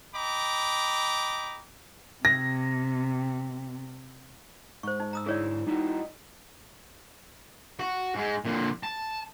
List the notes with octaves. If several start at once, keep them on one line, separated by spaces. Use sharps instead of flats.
D#5 G5 A#5 B5 D6
C3 A#6
G#2 C5 C#6
D#4
A#5 D#6 E6
D3 E4 G#4 C#5 D5
G3 D#4 E4 F#4
F#4
G#2 G#3
A#2 D3
A5